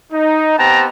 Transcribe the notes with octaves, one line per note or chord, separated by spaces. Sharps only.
D#4
B3 C4 G4 G5 A5 A#5